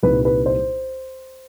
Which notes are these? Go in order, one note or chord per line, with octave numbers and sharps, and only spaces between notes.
C2 A#2 G3 C4 D#4 B4
B4
C5